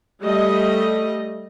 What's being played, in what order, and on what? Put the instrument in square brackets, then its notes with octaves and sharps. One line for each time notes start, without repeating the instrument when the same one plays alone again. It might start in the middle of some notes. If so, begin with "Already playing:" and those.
[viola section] G3 A3 D#5